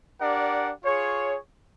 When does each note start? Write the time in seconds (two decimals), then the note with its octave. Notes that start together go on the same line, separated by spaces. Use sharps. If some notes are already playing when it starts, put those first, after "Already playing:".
0.19 D4 G4 A#4 D5 F#5
0.83 F4 G#4 C#5